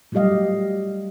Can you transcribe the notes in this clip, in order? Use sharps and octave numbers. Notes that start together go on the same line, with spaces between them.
F#3 G3 A3 G4 D#5 F5